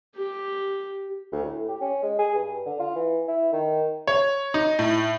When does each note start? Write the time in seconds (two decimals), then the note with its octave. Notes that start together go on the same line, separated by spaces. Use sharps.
0.16 G4
1.32 D2
1.44 A2
1.68 G4
1.81 C#4
2.03 G#3
2.19 G#4
2.35 G2
2.66 D3
2.80 F4
2.95 E3
3.28 E4
3.52 D#3
4.07 C#5
4.54 D#4
4.79 A2